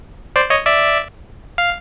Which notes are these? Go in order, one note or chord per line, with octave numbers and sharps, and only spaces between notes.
C5 D5
C#5 D#5
D5 E5
F5